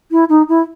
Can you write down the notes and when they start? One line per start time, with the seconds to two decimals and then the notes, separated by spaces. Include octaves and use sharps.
0.11 E4
0.29 D#4
0.49 E4